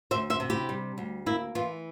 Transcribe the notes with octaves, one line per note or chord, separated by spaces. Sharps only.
D2 C5 E5
C5 E5
C3
E4 G4
G3
D2
A#3 E4
E3 F4